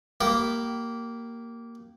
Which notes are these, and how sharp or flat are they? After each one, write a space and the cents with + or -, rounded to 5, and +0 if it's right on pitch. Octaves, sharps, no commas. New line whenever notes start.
A#3 -5 G4 -20 B5 +0